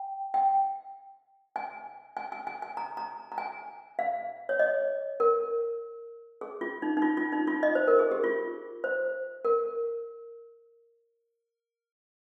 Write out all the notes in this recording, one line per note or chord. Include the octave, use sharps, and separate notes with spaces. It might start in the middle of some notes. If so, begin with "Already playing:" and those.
Already playing: G5
G5
G#5
G#5
G#5
G#5
G#5
A#5
A#5
A#5
G#5
F5
C#5
D#5
A#4
G#4
F4
D#4
D#4
F4
F4
D#4
F4
D#5
C5
A#4
G#4
G4
F4
C5
A#4